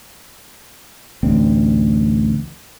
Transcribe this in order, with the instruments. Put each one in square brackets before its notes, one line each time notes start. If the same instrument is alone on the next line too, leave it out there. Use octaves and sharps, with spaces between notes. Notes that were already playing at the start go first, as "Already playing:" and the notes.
[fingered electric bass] A1 D2 C4